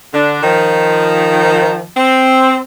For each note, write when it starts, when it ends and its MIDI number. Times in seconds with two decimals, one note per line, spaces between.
0.13 0.42 50
0.13 0.42 62
0.43 1.84 51
0.43 1.84 53
1.97 2.58 60